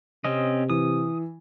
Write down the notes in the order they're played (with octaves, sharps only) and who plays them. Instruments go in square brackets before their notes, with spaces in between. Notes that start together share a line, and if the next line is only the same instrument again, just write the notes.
[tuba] C3 [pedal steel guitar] C4 C#4 D#5
[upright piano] E3 [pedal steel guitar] D#6